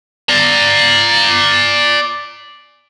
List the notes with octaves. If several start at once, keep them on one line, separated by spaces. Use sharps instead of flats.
D5 A#5